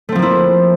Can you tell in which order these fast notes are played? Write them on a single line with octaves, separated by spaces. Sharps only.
A3 C4 F3 A#3 E4